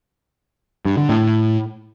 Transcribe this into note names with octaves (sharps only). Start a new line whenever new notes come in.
G2
D3
A2